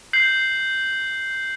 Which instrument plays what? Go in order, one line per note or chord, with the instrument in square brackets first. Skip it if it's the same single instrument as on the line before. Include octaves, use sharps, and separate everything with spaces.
[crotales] G6 C7 F#7